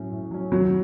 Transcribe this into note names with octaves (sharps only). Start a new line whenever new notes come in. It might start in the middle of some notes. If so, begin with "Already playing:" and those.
Already playing: A2 F#3 C#4
A2
F#3 C#4
D#2 F#3